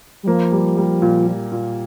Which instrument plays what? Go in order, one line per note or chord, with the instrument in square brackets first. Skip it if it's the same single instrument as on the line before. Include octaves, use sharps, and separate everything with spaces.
[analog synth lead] G3
[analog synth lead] F3 [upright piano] A#3
[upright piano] G3
G3
A#2
A#2
A#2